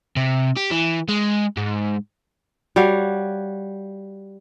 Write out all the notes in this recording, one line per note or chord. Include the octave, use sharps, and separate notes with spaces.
C3
G4
E3
G#3
G#2
G3 F#4 C#5 F5